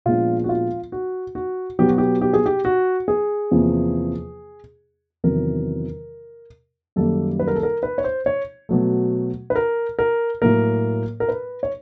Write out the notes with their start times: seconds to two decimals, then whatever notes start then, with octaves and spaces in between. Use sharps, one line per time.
0.06 A#2 F3 G#3 B3 D4 F4
0.44 F#4
0.49 F4
0.92 F#4
1.35 F#4
1.79 B2 F#3 B3 G4
1.88 F#4
1.98 G4
2.21 G4
2.33 G#4
2.46 G4
2.65 F#4
3.08 G#4
3.51 E2 C3 F3 A#3
5.24 E2 C3 D#3 F#3 A#4
6.96 F#2 D#3 G3 A#3 A4
7.39 B4
7.48 A#4
7.55 A4
7.63 A#4
7.83 B4
7.98 C#5
8.04 C5
8.26 C#5
8.69 B2 F#3 A3
9.50 B4
9.55 A#4
9.99 A#4
10.42 A2 F#3 A#3 A#4
11.20 A#4
11.29 B4
11.63 C#5